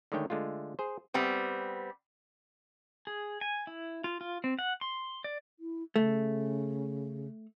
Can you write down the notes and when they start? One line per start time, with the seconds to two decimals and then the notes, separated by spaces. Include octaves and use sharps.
0.12 D3 D#3 G#3 A3 C#5 G5
0.30 D3 G#3 A3 F4
0.79 G#4 C5
1.14 G3 B3 C4
3.07 G#4
3.41 G#5
3.67 E4
4.04 F4
4.21 F4
4.44 C4
4.59 F#5
4.81 C6
5.24 D5
5.60 E4
5.96 C#3 A3